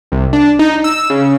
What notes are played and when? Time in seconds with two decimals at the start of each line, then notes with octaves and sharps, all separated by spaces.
0.12 C2
0.33 D4
0.59 D#4
0.84 E6
1.10 C#3